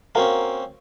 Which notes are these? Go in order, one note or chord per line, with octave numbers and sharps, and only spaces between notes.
A#3 C4 C#4 F#4 A#4 F5